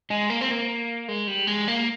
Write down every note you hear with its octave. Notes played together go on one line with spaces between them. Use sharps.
G#3
A#3
C4
A#3
G#3
G3
G#3
A#3